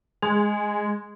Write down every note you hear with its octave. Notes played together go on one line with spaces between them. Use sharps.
G#3 G#4